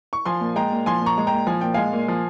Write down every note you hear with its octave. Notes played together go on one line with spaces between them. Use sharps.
C#6
F3 G#5 C6
A#2
G#3 G5 A#5
A#2
F3 G#5 C6
A#2
A#5 C#6
G#3
A#2 G5 A#5
F3 G#5
A#2 G5
G#3 F5 G#5
A#2
F3